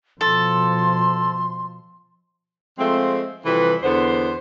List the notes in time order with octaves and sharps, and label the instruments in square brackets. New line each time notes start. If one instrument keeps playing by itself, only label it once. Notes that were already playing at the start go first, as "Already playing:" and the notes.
[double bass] B2 F3 [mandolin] A4 [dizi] C6
[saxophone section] F3 G#3 A3 C4
C3 E3 F3 G3 A4 B4
E2 D3 B3 C5